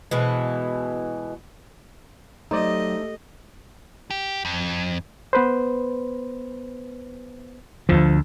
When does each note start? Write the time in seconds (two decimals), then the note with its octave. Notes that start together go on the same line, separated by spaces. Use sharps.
0.11 B2 E3 G#3
2.51 F#3 A3 D#4 G4 C5 D5 D#5
4.11 G4
4.45 F2
5.33 B3 B4 C5
7.89 D2 D3 F3